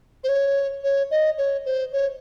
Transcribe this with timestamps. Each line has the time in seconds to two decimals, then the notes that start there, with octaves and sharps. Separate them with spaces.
0.24 C5
0.29 C#5
0.84 C#5
1.11 D#5
1.38 C#5
1.66 C5
1.93 C#5